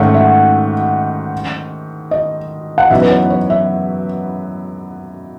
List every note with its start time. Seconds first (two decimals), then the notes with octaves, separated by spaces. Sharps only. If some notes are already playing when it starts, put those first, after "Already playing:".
Already playing: G#2 D#3 A3 C#4 E5 F#5
0.14 E5
2.11 D#5
2.78 F#5
2.90 F#2 E3 B3 D#4 E5
3.02 B4
3.11 C#5
3.30 C#5
3.50 E5